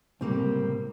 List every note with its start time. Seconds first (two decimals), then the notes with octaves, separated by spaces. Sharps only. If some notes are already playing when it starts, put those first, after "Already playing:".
0.21 C#2 A2 C3 G3 A#3 C4